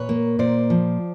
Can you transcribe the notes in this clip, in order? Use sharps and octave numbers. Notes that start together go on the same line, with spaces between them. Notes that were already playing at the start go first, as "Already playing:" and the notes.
Already playing: A#2 B4 C#5
A#3
A#2 C5 D5
F3